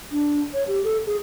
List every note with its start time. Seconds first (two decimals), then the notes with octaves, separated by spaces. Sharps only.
0.12 D4
0.54 C#5
0.68 G4
0.84 A4
1.07 G#4